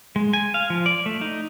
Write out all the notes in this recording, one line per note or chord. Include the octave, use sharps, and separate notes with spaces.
G#3
G#5
F5
F3
D5
A3
D#4